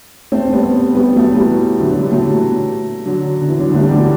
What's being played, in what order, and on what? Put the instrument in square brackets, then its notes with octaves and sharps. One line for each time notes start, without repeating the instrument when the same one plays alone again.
[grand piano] A3 C4
G3 B3
G3 B3
F#3 A3
E3 G3
D3 F#3
D3 F#3
E3 G3
F#3 A3
D3 F#3
D3
E3
D3 F#3
D3 F#3
A3
E3 G3
D4 F#4